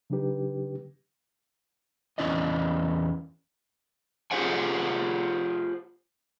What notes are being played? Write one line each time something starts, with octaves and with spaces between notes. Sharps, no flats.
C#3 F#3 D4 D#4 G4 B4
E2 G3 C#4 E4 D5 D#5
F4 G4 G#4 C5 F#5 G#5